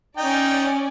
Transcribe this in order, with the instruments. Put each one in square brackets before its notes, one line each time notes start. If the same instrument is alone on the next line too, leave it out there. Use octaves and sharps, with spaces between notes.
[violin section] C#4 D5 [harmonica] D#4 G5